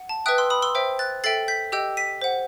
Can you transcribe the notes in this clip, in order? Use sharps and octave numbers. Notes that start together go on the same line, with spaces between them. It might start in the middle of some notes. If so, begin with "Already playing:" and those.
Already playing: F#5
A5
B4 E5 G5 D#6 F#6
C6 E6
B5 D#6
C6 E6
C5 E5 G5
F#6 A6
A4 E5 G5 A6 C7
G6 B6
G4 D#5 G5 E6 G6
B6 D#7
C5 F#5